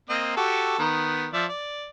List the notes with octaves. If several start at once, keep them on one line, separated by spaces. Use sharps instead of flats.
A#3 C4 D#5
F#4 G4 A4
D#3 B3
F3 D5 E5
D5